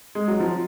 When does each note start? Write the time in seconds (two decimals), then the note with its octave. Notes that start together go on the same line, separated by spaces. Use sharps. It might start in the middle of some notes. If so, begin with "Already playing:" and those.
0.15 G#3
0.28 F#3
0.40 F3